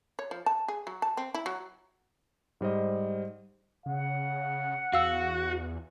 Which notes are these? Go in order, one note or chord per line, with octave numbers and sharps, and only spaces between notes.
C#5
F3
A5
G#4
F#3
A5
C4
E4
F#3
G#2 G3 C5 D#5
C#3 F#5
E2 F#4 F5 E6